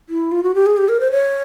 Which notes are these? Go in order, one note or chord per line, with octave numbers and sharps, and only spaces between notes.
E4
F4
F#4
G4
G#4
G4
A#4
C5
C#5